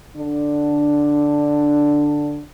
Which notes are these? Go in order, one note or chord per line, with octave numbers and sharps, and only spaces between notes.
D3 D4